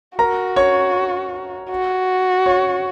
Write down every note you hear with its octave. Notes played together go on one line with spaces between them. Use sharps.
F#4 A#4 A#5
C#5 C#6
F#4
C#5 C#6